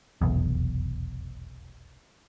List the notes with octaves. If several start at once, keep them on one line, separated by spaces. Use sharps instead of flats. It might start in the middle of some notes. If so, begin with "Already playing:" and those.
F1 B1 E2